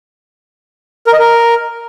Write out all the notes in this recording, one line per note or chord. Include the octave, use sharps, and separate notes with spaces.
A#4
D#5
A#4